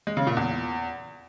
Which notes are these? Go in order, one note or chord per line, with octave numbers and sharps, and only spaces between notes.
G#3
C#3
A#2
E2